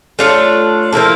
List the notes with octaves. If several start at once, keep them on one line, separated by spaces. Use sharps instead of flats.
A3 D4 F4 C#5
F3 A#3 E4 A4